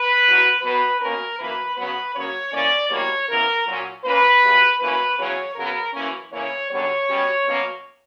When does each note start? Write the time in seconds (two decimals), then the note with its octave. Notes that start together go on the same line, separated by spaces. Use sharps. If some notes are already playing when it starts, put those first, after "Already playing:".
Already playing: B4
0.25 E2 B2 F#3
0.62 B2 F#3 B3 B4
1.01 B2 A#3 C#4 A#4
1.38 F#2 E3 A#3 B4
1.76 C#3 F#3 B3 B4
2.14 C#3 F#3 A#3 C#4 C#5
2.52 C#3 E3 A#3 C#4 D5
2.90 E2 B2 G3 A#3 C#5
3.28 C#3 E3 B3 A#4
3.66 A#2 F#3 C#4
4.04 A#2 A#3 C#4 B4
4.42 F#2 C#3 G3
4.80 F#2 E3 A#3 C#4 B4
5.18 E2 C#3 F#3 C#4 C#5
5.56 C#3 F#3 B3 A#4
5.94 F#2 E3 A#3 C#4
6.32 C#3 E3 A#3 C#4 C#5
6.70 F#2 D3 G3 B3 C#5
7.08 B2 G3 C#4
7.45 B2 F#3 A#3 C#4